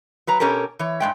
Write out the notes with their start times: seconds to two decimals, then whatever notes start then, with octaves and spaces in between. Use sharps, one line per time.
0.27 F#3 B4 A#5
0.40 B2 C#4 G4 A4 A#4
0.79 E3 C#5
1.00 G2 C#3 G#3 G5